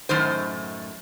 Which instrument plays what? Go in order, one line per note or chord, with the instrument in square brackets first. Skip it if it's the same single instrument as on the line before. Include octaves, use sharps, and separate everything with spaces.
[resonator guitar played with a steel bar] F#2 A2 D#3 C5